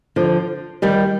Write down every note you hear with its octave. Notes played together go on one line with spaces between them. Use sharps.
D3 F3
D#3 G3